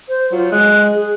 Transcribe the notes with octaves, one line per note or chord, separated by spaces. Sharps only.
C5
F#3 F4
G#3 F#6
G#4